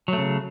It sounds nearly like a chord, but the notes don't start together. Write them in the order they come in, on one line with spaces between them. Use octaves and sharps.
F#3 A3 C#3